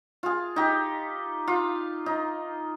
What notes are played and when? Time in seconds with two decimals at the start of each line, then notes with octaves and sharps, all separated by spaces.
0.23 F4 G#4
0.56 D#4 G4
1.47 F4
2.06 D#4